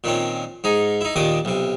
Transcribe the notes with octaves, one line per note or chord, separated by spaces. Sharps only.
A#2 D#3 C4 C#4
G#2 D#4 G#5
D#4 E4
D#2 A#2 D#3 D6 D#6
B1 C3